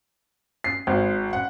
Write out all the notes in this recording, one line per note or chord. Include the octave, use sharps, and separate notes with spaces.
C7
G#1
F#5